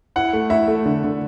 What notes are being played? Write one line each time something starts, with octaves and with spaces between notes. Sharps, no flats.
E4 F#5
A3
E4 E5
A3
D3
D3